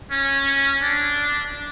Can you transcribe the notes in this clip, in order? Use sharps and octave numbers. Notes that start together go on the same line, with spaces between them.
C#4
D4